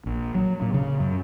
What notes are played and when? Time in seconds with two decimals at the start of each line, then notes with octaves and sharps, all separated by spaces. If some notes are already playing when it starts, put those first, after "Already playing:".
0.06 A#1
0.35 F#3
0.62 A#2
0.74 C#3
1.00 F#2